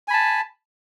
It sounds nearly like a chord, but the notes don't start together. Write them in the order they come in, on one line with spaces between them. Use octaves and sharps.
G#5 B5 A5